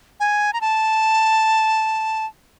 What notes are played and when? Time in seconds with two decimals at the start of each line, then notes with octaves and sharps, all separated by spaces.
0.20 G#5
0.53 A#5
0.61 A5